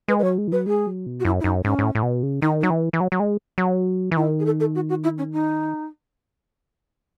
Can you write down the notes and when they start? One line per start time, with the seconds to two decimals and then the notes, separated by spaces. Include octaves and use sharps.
0.08 G#3 B4
0.19 B4
0.23 F#3 C#5
0.38 G#3
0.48 E3
0.52 F#3 B4
0.66 G#3 G#4
0.87 F#3
1.06 B2
1.20 F#4
1.25 F#2 E4
1.40 E4
1.44 F#2 D#4
1.64 G#2 C#4
1.79 G#2
1.83 A2
1.95 A2
2.03 B2
2.23 C#3
2.42 D#3 D#4
2.61 F#3 D#4
2.70 E3
2.93 E3
3.00 F#3
3.12 F#3
3.20 G#3
3.58 F#3
4.11 E3
4.17 D#3 E4
4.40 G#4
4.45 A4
4.60 A4
4.75 F#4
4.89 F#4
5.04 E4
5.18 C#4
5.33 D#4